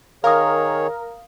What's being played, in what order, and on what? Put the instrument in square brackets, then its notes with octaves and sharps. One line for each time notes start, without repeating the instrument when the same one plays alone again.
[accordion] D#3 G#4 C#5 [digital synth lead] A#4 [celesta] F5 D#6